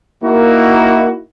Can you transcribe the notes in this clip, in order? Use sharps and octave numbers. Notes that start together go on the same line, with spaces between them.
A#3 D#4 E4 F#4